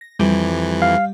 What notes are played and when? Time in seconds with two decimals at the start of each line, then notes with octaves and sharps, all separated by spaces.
0.01 A#6
0.19 F2 E3 G3 G4
0.82 F5